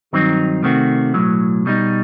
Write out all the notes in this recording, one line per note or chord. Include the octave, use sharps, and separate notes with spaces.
G2 D#3 F#3 C4 D#4
C3 D#3 A3 C4 F#4
B1 A2 F#3
B2 G3 D#4